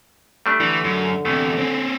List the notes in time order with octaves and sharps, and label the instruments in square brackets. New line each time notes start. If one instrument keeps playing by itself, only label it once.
[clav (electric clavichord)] G3 A3 D4
[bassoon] D3 [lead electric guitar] E3
[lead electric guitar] F#2
[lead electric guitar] E2 C3 [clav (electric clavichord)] A3
[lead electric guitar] C4 C#4